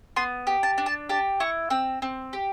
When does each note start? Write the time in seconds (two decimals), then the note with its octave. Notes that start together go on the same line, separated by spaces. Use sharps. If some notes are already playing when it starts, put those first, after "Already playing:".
0.16 B3 C6
0.47 G4
0.63 A5
0.78 D4
0.86 A5
1.09 G4 A5
1.40 E4 C#6
1.70 C4 E6
2.02 C4
2.33 G4